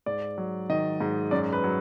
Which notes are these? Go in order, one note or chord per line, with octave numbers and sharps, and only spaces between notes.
G#2 D5
F#3
D#3 D#5
G#2
F#2 D5
B4
F#3